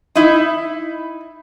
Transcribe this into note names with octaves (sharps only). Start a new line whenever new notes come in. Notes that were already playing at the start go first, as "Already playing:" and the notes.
D#4 E4